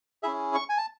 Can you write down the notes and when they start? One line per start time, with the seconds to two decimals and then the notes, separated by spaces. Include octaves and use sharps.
0.23 C#4 E4 G#4 E5
0.55 C#6
0.69 G#5
0.78 A5